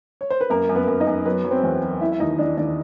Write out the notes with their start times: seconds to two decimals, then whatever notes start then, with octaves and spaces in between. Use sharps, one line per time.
0.21 C#5
0.30 C5
0.41 B4
0.50 F#2 A#3 A#4
0.69 F#2
0.75 B3 B4
0.87 F#2
1.00 D#4 D#5
1.07 F#2
1.25 F#3 B3 B4
1.44 F#3
1.51 C4 C5
1.63 E2
1.83 F#3
2.01 E3 E4 E5
2.12 E5
2.20 D#2 D#4 D#5
2.39 E3 D4 D5
2.57 D#2 D4 D5